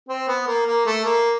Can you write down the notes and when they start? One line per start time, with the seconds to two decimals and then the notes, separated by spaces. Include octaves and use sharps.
0.09 C4
0.28 B3
0.47 A#3
0.66 A#3
0.86 A3
1.05 A#3